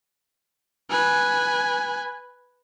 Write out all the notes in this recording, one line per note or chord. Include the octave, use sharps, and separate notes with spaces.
B4 G#5